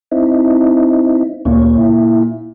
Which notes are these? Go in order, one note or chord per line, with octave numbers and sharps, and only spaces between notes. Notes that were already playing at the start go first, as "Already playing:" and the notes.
C4 D#4 E4
D2 A#2 C#5
E4